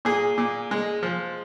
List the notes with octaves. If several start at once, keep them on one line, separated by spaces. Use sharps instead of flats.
A#2 G#4
A#2
G#3
F3